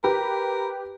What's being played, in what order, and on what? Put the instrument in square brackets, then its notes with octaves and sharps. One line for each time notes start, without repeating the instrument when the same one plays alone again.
[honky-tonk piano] G4 B4 [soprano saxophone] A#4